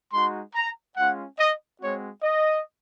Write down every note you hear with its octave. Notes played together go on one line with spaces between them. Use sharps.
G#3 D#4 F#4 C6
A#5
G#3 C#4 F4 F#5
D#5
G#3 C4 F#4 C#5
D#5